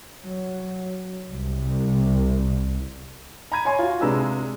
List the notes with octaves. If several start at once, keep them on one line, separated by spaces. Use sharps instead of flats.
F#3
C2
A#5 B5 G#6 D#7
C#5 G#5 C6
F4 F#4
C3 G#3 D4 B4 A#5 E6